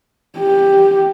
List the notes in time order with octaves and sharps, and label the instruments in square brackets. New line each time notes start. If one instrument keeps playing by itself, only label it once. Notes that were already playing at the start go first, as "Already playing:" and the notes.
[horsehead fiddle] G4